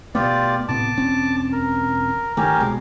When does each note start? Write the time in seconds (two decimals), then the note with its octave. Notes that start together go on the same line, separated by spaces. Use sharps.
0.15 B2 A3 B3 F4 G4 D5
0.68 A2 C3 B3 A5 D6
0.97 E1 C4 C#4
1.53 A#4
2.37 G1 D#3 A3 C#4 G4 A#4
2.60 C2 B2 G#3